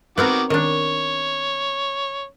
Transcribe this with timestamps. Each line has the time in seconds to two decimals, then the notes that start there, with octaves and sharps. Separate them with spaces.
0.18 D#3 B3 C4 F#4 A#4 D6
0.50 D#3 D4 C#5